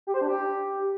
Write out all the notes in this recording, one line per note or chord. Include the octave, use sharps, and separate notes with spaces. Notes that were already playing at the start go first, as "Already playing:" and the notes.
G4
C5
D4
G4